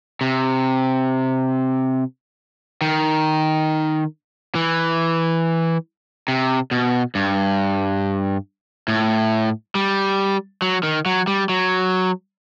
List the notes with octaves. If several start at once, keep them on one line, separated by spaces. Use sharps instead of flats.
C3
D#3
E3
C3
B2
G2
A2
G3
F#3
D#3
F#3
G3
F#3